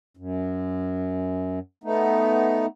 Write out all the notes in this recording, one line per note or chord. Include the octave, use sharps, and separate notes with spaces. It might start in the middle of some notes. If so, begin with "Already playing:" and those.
F#2
A3 B3 D#4